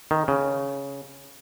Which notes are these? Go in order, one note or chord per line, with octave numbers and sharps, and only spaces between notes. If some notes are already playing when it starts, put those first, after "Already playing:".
D#3
C#3